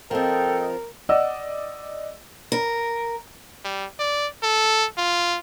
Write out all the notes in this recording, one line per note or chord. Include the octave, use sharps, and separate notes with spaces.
F3 C4 A4 A#4 D#5 G5
D5 D#5 F#5 E6
A#4
G3
D5
A4
F4